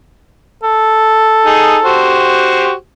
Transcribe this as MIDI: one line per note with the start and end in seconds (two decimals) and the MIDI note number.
0.64 2.13 69
1.46 1.78 63
1.46 1.78 68
1.84 2.73 66
1.84 2.73 67
1.84 2.73 72